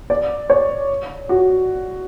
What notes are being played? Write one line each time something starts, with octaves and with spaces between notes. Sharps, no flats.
D5
C#5
F#4